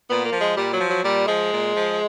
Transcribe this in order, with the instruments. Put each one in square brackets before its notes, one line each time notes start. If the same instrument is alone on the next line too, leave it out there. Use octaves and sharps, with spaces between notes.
[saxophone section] A#2 B3
A#3
F3
G#3
A#2 G3
F#3
F3
F#3
A#2 G3
F3 G#3
A#2
F3